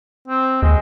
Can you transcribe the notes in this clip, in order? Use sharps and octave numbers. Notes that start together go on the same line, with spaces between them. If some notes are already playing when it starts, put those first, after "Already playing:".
C4
D#2 G#3